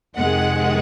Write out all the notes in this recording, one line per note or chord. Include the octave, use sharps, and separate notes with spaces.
F2 C3 D#3 G#3 F#5